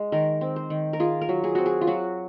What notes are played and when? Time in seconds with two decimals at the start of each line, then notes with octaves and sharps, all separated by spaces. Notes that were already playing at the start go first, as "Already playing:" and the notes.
Already playing: G#3
0.12 D#3 A#4
0.41 C4
0.56 C5
0.70 D#3
0.93 A#4
1.00 F4 G#4
1.21 A#4
1.29 F#3
1.44 G#4
1.55 C4 F#4
1.66 G#4
1.81 F4
1.87 F#3 F#4